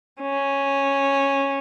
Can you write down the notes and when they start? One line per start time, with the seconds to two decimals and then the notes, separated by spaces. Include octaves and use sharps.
0.21 C#4